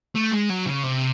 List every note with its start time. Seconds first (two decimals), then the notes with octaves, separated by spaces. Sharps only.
0.15 A3
0.32 G#3
0.50 F#3
0.66 C#3
0.83 C3